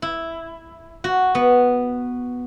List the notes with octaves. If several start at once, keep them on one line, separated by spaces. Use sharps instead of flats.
E4
F#4
B3